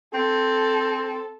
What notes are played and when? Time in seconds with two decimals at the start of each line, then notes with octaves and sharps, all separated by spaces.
0.14 C4 A4